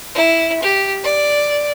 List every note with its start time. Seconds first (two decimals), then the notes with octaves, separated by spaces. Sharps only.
0.15 E4
0.63 G4
1.04 D5